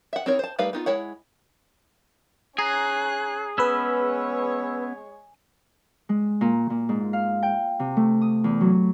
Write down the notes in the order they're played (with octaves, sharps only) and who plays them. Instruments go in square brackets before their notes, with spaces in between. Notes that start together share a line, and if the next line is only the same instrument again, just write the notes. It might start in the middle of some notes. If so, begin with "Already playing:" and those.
[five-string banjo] E5 F#5
C4 D#4 E4 A#4 C#5
C5 A5
G3 A3 D#4 B4 F5
B3 D#4 F4
G#3 E4 C#5 F#5
[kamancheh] C#4 F#6 [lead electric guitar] G#4 [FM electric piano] A#5 G#6 C7
[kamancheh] G#3 C#5 [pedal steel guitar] B3 C#4 [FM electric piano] B4 B5 E6
[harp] G#3
A#2
A#2
G#2
F5
G5
C3
A3
D#6
E2
F#3